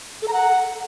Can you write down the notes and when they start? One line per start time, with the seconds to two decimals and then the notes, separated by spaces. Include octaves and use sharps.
0.22 A4
0.28 A#5
0.33 F#5